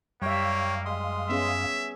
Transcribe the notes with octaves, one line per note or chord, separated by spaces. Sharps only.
F#2 G3 A#3 C#5 E5 F5 G5
G#3 C6 D#6
B3 C#4 G#4 E5